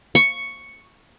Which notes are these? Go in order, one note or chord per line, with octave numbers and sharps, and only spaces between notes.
C#6